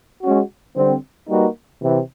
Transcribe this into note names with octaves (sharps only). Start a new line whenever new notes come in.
G#3 C#4 F#4
D3 G3 C4
G3 A#3 D#4 F#4 B4
C3 E3